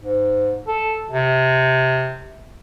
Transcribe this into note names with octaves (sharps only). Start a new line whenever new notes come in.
G#2
A4
C3